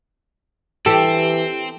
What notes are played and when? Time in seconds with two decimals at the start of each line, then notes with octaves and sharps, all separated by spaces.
0.86 E3 C4 G4 A4